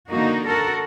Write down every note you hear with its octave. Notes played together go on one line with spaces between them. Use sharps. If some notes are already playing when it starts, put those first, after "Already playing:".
D3 A#3 D#4 F#4
F#4 A4 A#4